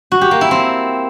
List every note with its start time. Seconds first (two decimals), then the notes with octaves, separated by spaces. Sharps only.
0.12 F#4
0.21 G4
0.31 A#3
0.41 E4
0.51 C4